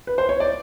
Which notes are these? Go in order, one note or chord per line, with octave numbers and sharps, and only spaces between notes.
B4
C5
C#5
D5